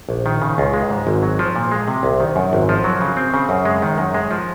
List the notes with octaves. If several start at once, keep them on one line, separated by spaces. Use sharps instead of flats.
A#1
D#3
C#3
C#2
G#3
G#2
G#1
F#3
F3
A#2
G#3
C3
C2
D#3
F#2
G#1
F3
F#3
C#3
C4
C#3
F#2
G#3
D#3
F#2
G#3
F3